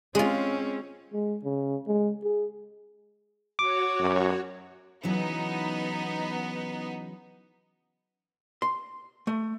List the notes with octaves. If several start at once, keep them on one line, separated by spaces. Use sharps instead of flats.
G#3 C4 C#4 F4
G#3
C#3
G#3
G#4
F#4 C#5 D6
F#2
C#3 E3 F#3 B3 D#4
C6
A3